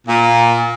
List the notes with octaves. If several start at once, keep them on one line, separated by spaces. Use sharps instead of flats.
A#2